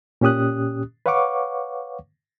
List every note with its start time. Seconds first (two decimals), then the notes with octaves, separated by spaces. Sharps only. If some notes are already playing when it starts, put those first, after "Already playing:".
0.21 A#2 C#4 G4 D#6 F#6
1.06 B4 C#5 F5 F#5 C#6 D6